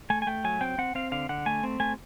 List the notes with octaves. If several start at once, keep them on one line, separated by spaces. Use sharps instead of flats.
A3 G#5
G#5
A3 G5
F#3 G#5
C4 G5
C4 F#5
C4 F5
D3 F5
D3 F#5
A3 G#5
C4
A3 G#5